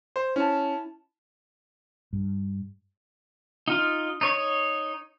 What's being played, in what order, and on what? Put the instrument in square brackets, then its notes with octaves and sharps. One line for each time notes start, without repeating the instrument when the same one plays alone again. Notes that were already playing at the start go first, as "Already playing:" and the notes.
[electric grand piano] C5
[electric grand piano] C#4 [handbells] E4 A5
[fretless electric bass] G2
[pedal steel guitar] D#4 F4
D#4 C#5 C#6